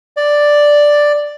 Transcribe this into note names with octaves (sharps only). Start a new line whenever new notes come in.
D5